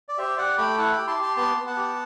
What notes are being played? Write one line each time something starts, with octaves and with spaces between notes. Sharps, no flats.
D5
G4 C5 E5
G4 D5 F#5
A3 G5 B5
E4 F#5 A5
G5 B5
G4
A5 C6
G4
A5 C6
B3 A5 C6
B3
F#5 A5
G4